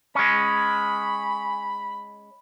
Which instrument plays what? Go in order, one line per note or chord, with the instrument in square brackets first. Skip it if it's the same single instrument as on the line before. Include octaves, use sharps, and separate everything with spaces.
[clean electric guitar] G#3 C#4 [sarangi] B5